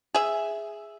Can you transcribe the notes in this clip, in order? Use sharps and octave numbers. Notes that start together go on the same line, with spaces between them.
G#4 E5